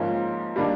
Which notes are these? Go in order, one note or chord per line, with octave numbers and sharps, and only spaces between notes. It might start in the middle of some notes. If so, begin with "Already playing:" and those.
Already playing: G#2 F3 A#3 C#4
D#3 G3 A#3 D4